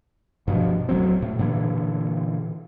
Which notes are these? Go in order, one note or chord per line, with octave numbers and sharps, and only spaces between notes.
G2 B2 F3
D1 F#3 C4
A2
A#2 D3 E3